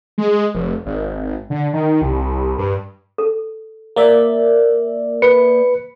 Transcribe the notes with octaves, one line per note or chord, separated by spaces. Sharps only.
G#3
F1
G#1
D3
D#3
C2
G2
A4
A#3 D5 E5
B4 C#7